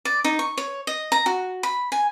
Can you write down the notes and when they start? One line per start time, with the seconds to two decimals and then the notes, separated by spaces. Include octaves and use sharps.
0.05 D5
0.24 D#4
0.39 C#6
0.57 C#5
0.87 D#5
1.12 A#5
1.26 F#4
1.63 B5
1.92 G#5